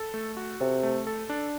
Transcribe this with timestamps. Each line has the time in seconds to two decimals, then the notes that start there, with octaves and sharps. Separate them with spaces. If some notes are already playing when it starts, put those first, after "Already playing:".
Already playing: A4
0.14 A3
0.37 F#4
0.60 C3 A4
0.83 A3
1.07 A4
1.29 D4